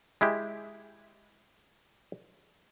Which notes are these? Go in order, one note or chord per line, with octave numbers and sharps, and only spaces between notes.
G#3 E4 G4